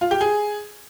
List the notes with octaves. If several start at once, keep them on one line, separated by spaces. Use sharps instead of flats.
F4
G4
G#4